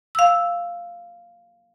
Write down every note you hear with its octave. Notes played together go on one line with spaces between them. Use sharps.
F5 E6